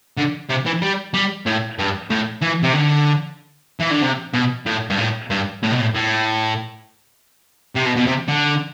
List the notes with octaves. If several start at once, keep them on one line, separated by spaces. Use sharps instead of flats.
D3
C3
E3
G3
G3
A2
G2
A2
E3
C3
D3
E3
D3
C3
B2
A2
G2
A2
G2
A2
B2
A2
A2
C3
B2
B2
C3
D3